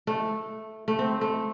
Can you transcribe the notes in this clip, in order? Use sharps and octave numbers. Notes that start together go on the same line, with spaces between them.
A3
A3
C4
A3